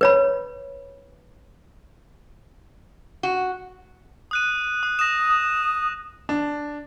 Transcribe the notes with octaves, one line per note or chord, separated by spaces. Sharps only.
B4 C#5 B5
F#4
D#6 F#6 D#7
D#6
D#6 A#6 E7
D4